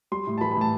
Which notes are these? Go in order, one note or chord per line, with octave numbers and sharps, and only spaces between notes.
G3 C6
A2
A5
E3 B5
B5
A2 A5